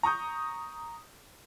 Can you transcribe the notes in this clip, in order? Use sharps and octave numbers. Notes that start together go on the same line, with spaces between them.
A#5 C#6 D#6 G6